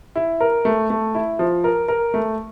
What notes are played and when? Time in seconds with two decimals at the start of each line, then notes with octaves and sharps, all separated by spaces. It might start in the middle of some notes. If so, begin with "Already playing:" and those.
0.16 E4
0.41 A#4
0.65 A3
0.90 A3
1.15 E4
1.39 F3
1.64 A#4
1.88 A#4
2.14 A3